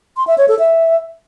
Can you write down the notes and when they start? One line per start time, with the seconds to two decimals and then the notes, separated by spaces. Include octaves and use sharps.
0.17 C6
0.27 E5
0.38 C#5
0.48 A4
0.59 E5